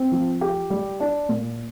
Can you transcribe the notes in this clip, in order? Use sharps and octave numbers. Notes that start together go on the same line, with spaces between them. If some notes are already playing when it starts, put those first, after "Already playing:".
Already playing: C4
F3
G4
G3
D4
A#2